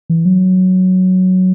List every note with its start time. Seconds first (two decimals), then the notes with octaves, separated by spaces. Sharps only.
0.10 E3
0.25 F#3